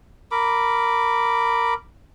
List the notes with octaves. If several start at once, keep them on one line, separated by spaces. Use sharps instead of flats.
A#4 B5 D6